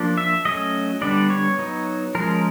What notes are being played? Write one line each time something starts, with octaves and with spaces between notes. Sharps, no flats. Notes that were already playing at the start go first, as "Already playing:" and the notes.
Already playing: F3 A#3 D4
E5
F#3 A3 C#4 D#5
D3 G3 B3 D4 D5
C#5
F#3 B3 D#4
F3 G#3 C#4 A#4